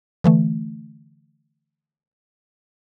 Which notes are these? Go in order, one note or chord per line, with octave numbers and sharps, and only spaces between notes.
D3 E3 A3